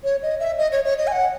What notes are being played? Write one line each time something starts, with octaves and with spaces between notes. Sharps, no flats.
C#5
D#5
E5
D#5
C#5
C#5
D#5
G#5
F#5